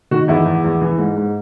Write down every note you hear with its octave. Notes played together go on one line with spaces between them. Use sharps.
D#3 F#4
E2 E4
E2
E2
E3
G#2
G#2